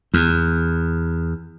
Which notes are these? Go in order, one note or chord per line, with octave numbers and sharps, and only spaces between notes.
E2